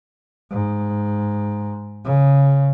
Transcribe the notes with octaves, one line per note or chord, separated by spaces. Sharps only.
G#2
C#3